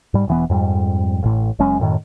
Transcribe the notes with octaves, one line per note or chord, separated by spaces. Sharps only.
G#2 G3
E1 E3 B3
F2 G#2 G3
A1 A2
F#1 F#2 G#3 C#4
F#2 A2 D#3